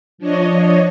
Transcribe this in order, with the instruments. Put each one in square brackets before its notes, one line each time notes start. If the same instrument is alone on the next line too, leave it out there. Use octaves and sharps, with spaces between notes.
[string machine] F3 D4 C#5 D#5